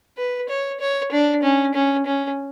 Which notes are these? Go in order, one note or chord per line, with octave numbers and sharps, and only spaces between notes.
B4
C#5
C#5
D4
C#4
C#4
C#4